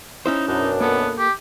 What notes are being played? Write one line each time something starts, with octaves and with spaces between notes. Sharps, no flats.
C#4 D#4 E4 C5
F#2 B2 D4 D#4
A#3 B3 A4
G4